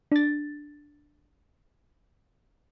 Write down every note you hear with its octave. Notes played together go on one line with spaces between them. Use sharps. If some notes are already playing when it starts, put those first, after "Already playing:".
D4 A6